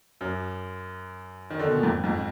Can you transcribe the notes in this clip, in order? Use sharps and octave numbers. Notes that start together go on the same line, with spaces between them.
F#2
D#3
D3
B2
A#2
F2 G#2
F2 G#2